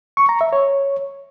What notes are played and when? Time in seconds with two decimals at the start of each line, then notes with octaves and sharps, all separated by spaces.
0.17 C#6
0.29 A#5
0.41 E5
0.53 C#5